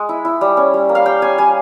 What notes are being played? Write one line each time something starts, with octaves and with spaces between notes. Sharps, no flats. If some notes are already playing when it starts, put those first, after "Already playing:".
Already playing: G#3
E4
E4
G3
C#4
G3
A#3
F5
G3 G5
C#4 G#5
G3 G#5